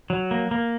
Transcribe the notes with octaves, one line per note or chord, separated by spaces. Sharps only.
F#3
A#3
A#3